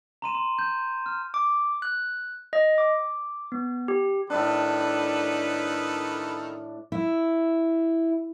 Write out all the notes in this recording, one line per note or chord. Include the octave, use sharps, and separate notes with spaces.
A#5 C6 D#7 E7
C6
G6
F6
D6
F#6
D#5
D6
B3
G4
A2 D#3 D4 A4 B4
E4